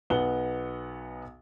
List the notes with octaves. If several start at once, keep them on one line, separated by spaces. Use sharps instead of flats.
B1 B3 F#5 G7